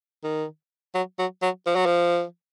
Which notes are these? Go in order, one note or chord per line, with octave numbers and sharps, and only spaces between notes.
D#3
F#3
F#3
F#3
F3
F#3
F3